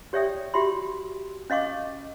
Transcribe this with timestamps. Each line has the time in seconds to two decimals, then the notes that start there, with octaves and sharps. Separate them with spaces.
0.13 G4 C#5 D5 E5 G5 D#6
0.54 F#4 G4 E5 B5 C6
1.50 C#4 D#5 F5 C#6 D6